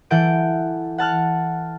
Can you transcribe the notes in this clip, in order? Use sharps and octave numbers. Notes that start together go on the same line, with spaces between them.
E3 A4 F#5 G6 D7
F#5 A5 F6 F#6